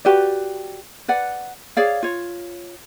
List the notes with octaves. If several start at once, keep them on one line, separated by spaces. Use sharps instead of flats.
F#4 G4 B4 D5
B4 D5 F#5
G#4 C#5 D5 F5
F4 C#5